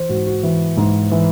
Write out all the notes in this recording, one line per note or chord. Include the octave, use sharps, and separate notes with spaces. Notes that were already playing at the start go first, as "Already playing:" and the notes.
Already playing: E3 C5
G#2 F#4
F#4
E3
G#2
E3